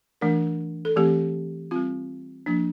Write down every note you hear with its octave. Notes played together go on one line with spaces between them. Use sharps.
E3 A3 D4 A#4
A4
E3 A3 C4 G4
G3 C4 F4
F3 A#3 D4